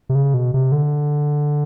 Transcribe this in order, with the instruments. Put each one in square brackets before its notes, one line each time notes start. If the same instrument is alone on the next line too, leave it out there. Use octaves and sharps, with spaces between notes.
[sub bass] C3
C#3
B2
C3
D3